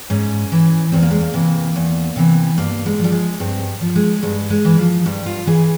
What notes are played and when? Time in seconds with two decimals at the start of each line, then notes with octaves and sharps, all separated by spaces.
0.10 G#2 C#4
0.52 E3
0.92 E2 C4
1.02 A#3
1.11 G#3
1.21 A#3
1.34 C3 E3
1.76 E2
2.16 C3 E3
2.58 G2 A#3
2.86 G#3
2.99 F3 G3
3.12 G#3
3.40 G2 C4
3.81 F3
3.96 G#3
4.23 G2 G#3
4.50 G#3
4.65 E3
4.78 F3
5.06 G2 G3
5.26 F4
5.47 E3 G#4